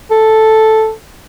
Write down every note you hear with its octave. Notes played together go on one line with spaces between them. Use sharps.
A4